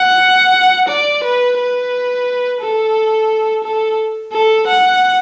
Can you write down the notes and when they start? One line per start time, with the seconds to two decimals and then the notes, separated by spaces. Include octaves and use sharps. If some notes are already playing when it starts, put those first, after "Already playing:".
Already playing: F#5
0.88 D5
1.23 B4
1.57 B4
2.60 A4
3.64 A4
4.32 A4
4.67 F#5